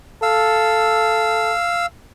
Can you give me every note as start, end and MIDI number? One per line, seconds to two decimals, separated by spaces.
0.23 1.54 69
0.23 1.86 77
0.23 1.86 88